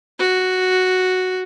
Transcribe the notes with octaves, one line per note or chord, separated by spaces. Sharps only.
F#4